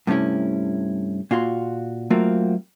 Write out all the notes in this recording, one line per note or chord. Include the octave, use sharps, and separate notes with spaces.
G2 C3 A3 C#4 E4
A#2 F4 F#4 C6
F#3 A3 A#3 C4 F4 F#4